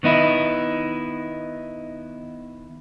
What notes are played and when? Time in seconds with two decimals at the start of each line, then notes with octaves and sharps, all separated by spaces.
0.03 D#3 B3 D#4 E4